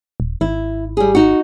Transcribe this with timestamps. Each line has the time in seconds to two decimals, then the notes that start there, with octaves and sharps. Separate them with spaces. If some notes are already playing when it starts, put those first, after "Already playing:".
0.20 D#1
0.41 G#1 E4
0.97 G3 G#4
1.15 D#4 F#4